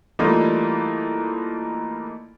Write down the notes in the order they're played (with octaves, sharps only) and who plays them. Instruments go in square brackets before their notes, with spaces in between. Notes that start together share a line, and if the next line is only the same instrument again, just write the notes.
[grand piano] E3 G3 A3 A#3 D#4 F4